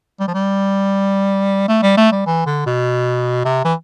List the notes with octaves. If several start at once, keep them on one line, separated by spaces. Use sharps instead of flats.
G3
F3
G3
A3
G3
A3
G3
E3
D3
B2
C3
E3